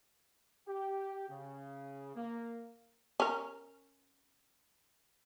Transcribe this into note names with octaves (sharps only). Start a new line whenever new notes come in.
G4
C#3
A#3
C#4 A#4